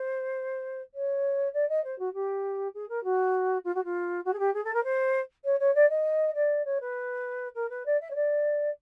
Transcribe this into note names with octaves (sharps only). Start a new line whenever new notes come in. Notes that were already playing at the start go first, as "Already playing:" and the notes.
Already playing: C5
C#5
D5
D#5
C5
F#4
G4
G#4
A#4
F#4
F4
F#4
F4
F#4
G#4
G4
G#4
A4
A#4
C5
C#5
C#5
D5
D#5
D5
C#5
B4
A#4
B4
D5
E5
C#5
D5